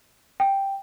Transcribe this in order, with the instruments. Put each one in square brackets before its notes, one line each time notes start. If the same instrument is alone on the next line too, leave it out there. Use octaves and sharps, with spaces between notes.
[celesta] G5